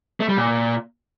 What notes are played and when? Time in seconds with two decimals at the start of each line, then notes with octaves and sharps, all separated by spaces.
0.20 A3
0.29 G3
0.37 A#2